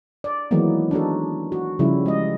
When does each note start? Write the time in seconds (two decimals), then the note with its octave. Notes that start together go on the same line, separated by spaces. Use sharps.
0.24 D5
0.51 D#3 E3 F#3 G#3 A#3 B3
0.91 D4 D#4 F#4 A4
1.52 F#4
1.79 C#3 F3 G3 E4
2.06 G#3 D#5